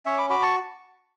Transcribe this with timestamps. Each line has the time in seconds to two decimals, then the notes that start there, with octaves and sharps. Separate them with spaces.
0.06 C#4 C#5 E5
0.18 B5 D6
0.30 F#4 B5 D6
0.42 A5 C#6